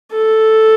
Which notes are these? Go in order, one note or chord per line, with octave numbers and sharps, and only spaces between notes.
A4